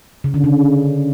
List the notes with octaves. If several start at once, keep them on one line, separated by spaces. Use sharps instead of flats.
C#3
D3
C#3